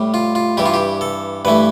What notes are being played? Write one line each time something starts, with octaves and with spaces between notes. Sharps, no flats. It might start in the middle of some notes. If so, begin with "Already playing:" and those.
Already playing: A2 G3
F4
F4
G2 E3 G3 G4
F4
G4
A4
G2 E3 A3 B4